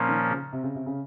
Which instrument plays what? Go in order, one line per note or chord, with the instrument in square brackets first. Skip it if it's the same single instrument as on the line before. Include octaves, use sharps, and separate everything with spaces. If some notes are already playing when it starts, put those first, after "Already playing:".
Already playing: [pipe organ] A#2 F3 A#3 C#4
[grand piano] D#3
C#3
C3
C#3
C3
C#3